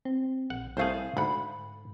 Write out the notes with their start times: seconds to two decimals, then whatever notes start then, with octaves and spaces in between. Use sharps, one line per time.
0.05 C4
0.50 A#1 F#5
0.77 C2 A3 G#4 C5 F5
1.17 D2 G#2 F#5 B5